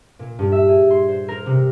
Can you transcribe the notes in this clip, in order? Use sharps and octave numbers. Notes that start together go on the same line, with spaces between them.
A#2
G2
E5
G#4
C6
C5
A#4
C3